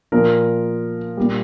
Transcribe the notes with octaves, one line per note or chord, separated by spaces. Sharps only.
A#2 F3 A#4
A#2 G3